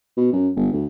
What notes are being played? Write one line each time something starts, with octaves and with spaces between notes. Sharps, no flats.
B2
F#2
G1
D2